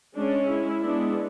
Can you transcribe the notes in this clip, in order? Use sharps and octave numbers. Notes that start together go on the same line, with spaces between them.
G#3 C#4 D4
E4
G#3 B3 D4